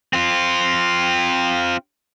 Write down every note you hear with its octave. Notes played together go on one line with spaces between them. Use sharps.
C4 F4